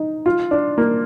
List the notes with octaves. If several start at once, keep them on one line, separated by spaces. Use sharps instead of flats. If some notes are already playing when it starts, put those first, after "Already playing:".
Already playing: D#4
F4
D4
A#3